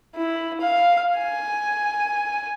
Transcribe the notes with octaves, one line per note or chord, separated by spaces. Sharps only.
E4
F5
G#5